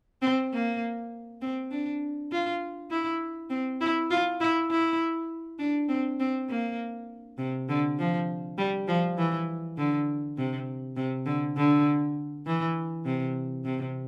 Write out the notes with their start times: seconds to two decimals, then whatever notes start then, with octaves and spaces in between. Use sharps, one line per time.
0.22 C4
0.53 A#3
1.41 C4
1.71 D4
2.32 F4
2.90 E4
3.50 C4
3.81 E4
4.10 F4
4.40 E4
4.70 E4
5.59 D4
5.89 C4
6.20 C4
6.49 A#3
7.38 C3
7.69 D3
7.98 F3
8.58 G3
8.88 F3
9.17 E3
9.78 D3
10.37 C3
10.96 C3
11.26 D3
11.57 D3
12.46 E3
13.05 C3
13.65 C3